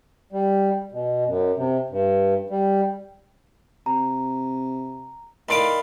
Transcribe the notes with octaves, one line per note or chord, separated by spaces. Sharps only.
G3
B2
F#2
C3
G2
G3
C3 A#5
A2 D#3 D5 F5 B5 C6 D7